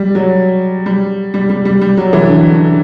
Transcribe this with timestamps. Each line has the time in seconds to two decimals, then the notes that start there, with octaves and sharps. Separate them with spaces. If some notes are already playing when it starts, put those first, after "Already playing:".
Already playing: G3
0.15 F#3
0.86 G3
1.34 G3
1.50 G3
1.65 G3
1.81 G3
1.97 F#3
2.13 E3
2.28 D3
2.52 D3